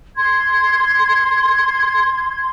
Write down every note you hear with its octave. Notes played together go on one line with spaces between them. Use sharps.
C6 G#6